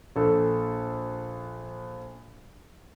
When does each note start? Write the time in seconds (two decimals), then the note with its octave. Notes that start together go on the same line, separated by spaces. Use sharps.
0.16 A#1 A4